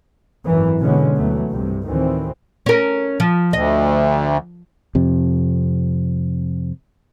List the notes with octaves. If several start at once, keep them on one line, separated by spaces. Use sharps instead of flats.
G#1 F#2 E3
B2 D3 F#3 G#3 B3 C#4
D2 E3 F#3 A3 B3
C2 G2 C3
D2 A2 D#3 E3 C4
C#4 A#4
F3
D2 D#5
F2 C3